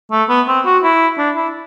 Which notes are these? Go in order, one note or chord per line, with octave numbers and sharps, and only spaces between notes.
A3
B3
C4
F#4
E4
D4
E4